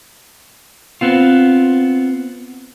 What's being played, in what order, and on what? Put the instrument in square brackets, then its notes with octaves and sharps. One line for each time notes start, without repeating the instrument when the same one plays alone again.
[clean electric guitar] B3 C4 F4